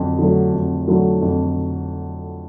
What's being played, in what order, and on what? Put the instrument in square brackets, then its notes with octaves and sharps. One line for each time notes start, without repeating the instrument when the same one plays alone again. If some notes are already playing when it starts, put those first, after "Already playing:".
Already playing: [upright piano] F2 D3 F#3
D3 F#3 A3
F2
D3 F#3 A3
F2